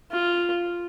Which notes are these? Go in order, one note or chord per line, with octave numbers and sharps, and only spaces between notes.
F4